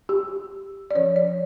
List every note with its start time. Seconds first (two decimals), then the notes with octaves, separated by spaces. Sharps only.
0.09 G4
0.91 D5
0.95 F3 C#4 C#5
1.16 D5